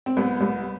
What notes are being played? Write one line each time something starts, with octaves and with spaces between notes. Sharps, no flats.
C4
C2 B3
C2